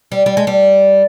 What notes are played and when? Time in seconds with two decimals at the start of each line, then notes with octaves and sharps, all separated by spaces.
0.12 G3
0.26 G3
0.37 G#3
0.47 G3